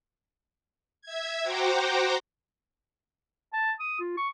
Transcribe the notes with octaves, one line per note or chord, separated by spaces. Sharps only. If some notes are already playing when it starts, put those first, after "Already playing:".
E5 G#6
F#4 C5 F#5 G5 A#5 D6
A5
D#6
F4
C#6